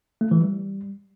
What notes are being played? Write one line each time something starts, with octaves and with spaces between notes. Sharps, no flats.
A3
E3
G3